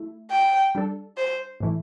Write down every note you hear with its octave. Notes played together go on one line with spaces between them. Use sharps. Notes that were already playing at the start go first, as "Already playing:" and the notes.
Already playing: A3 E4
G5
G3 D4 A4
C5
A2 E3 A3 E4